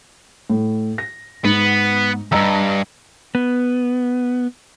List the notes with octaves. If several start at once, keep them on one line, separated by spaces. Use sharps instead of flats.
A2
A#6
G#2 B3
E2 G2 D#5 A#5 E6
B3